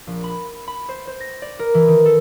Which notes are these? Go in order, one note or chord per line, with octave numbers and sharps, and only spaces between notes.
A#1
B5
B5
C5
C5
A#6
D5
A#4
E3
D#3
A4